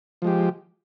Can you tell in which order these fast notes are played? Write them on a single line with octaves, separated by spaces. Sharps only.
F3 G#3 G4